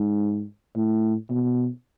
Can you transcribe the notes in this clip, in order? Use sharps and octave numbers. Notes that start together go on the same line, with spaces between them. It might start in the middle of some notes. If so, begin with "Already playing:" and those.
Already playing: G#2
A2
B2